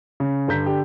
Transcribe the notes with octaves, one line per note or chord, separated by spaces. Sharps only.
C#3
G2 D3 A#5 G6 B6
D3 G4